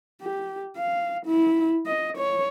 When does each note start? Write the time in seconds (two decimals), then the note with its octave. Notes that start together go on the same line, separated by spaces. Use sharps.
0.21 G4
0.77 F5
1.26 E4
1.86 D#5
2.17 C#5